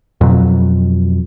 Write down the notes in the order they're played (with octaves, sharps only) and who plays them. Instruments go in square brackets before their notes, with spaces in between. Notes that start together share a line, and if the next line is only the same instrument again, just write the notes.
[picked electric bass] F2 B2 F#3